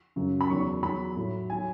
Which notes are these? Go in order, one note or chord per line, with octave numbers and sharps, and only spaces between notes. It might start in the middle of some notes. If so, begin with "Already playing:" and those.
F#2 C#3 F#3
B5
E2 D#3 F#3 C#6
E2 D#3 F#3 B5
A2 F#3
D#3 F#3 G#5